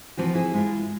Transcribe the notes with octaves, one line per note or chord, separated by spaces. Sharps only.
E3 F3 C4 F#4
E4 G#4
G#3 E4 F4